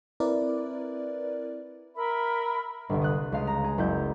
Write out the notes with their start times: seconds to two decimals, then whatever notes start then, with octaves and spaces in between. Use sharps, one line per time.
0.20 C4 E4 A#4 B4 D5
1.96 A#4 E5 B5
2.89 G1 C2
3.02 D#6 F#6
3.32 C#2 F5 D#6
3.47 A#5
3.64 G#4
3.78 F#1 E4 G6